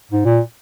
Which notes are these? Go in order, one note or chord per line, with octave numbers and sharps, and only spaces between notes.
G#2
A#2